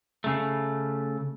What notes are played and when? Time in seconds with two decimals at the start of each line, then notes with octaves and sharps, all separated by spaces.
0.24 C#3 A3